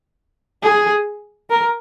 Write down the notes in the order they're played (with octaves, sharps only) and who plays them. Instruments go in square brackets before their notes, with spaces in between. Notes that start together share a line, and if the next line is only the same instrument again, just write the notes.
[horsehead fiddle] G#4
A#4